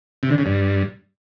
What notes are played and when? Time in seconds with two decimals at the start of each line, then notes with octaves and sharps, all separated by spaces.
0.23 C3
0.30 D3
0.38 C#3
0.46 G2